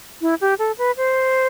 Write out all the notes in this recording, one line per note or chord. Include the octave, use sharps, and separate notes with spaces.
E4
G4
A4
B4
C5